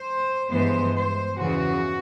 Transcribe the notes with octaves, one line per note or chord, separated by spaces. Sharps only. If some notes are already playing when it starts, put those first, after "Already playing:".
Already playing: C5
G2 E3 G#3 B3 C5
C5
E2 C#3 E3 F#4